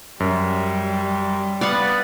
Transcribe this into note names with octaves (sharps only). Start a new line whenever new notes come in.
F#2 G3
B3 D5 F5 F#5